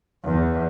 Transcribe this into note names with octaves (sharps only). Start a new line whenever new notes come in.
E2